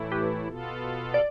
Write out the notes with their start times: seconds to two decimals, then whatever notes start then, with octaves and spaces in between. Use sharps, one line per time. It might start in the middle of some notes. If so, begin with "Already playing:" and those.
Already playing: A2 E3 A3 E4
0.12 G4 B4
0.47 B2 B3 F4 A4
1.14 D5